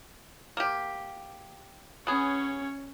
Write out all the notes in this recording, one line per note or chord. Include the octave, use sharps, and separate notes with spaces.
A#3 G4
B3 C#4 G#4 C#5